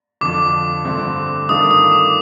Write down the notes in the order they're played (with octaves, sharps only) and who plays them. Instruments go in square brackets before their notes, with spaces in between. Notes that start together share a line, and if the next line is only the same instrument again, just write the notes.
[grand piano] F2 D3 F3 [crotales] D6
[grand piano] G2 D3 A3 C4
[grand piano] G2 D#3 A3 D4 F4 [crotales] D#6
[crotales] D#6
D6